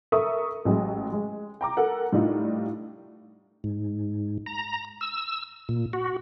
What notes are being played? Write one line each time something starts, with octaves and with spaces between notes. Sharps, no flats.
A4 A#4 E5 C#6 D#6
A1 F#3 G#3
G#3
G5 A#5 D6
A4 A#4 F#5
A2 G3 D4 D#4 F4
G#2
A#5
E6
A#2
F#4